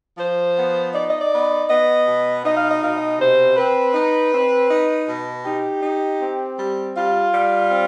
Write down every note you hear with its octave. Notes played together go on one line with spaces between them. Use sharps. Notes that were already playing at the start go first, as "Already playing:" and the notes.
F3 C5
B3
D#4 D5
D#5
D5
B3
B3 D#5
B2
D#4 D#5
F5
D#5
B2 F5
D#5
C3 C5
C4 B4
D#4
C4
D#4
B2
D#4 G4
D#4
C4
G3
G3 F4
G3
C4